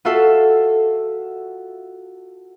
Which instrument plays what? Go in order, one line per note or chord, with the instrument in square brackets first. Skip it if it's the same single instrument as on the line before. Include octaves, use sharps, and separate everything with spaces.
[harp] F4 F#4 A4 E5 C7